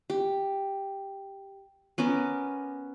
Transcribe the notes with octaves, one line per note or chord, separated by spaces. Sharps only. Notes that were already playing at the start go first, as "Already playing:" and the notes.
G4
B3 C#4 A#4 D6